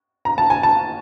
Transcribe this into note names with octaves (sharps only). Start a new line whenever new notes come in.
A#5
A5
G#5
A5